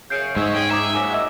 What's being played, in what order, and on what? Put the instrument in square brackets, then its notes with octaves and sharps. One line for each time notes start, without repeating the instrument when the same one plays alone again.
[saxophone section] F#2 C#3 [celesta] G6 C7 D7
[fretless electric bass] G#2 [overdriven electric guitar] G#3 [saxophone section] C#5 E5
[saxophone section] C#4 D4 G#4 [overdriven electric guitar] G5
[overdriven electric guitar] E5 [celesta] A#5 D6 G#6
[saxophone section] A#2 F#3 [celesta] G#5 D6
[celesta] D#5 E5 E6